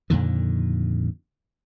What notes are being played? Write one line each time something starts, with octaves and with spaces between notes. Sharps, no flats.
F2 A#2 D3 D#3